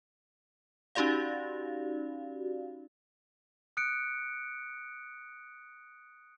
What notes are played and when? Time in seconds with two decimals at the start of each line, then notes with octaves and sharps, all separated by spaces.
0.95 C#4 D#4 F#4 G4 D5 F5
3.77 D#6 F#6 C#7 D7